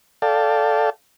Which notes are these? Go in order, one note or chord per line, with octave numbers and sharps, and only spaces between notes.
A4 D5 F5 G5 A5